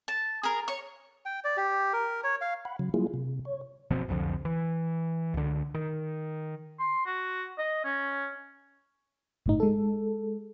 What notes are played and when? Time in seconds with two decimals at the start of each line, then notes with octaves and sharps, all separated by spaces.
0.08 A5
0.43 G#4 A#4
0.68 C#5 C#6
1.26 G5
1.44 D5
1.57 G4
1.93 A#4
2.24 C#5
2.41 F5
2.65 F#5 B5
2.79 C#3 F#3
2.94 F#3 G3 A#3 E4 F4 G#4
3.14 C3
3.45 C#5
3.90 F#1 B2 F3 C4
4.08 C2 F2 D3 F3
4.45 E3
5.34 C#2 D3
5.74 D#3
6.79 C6
7.06 F#4
7.58 D#5
7.84 C#4
9.46 G1 A2 D#4
9.60 G#3 A4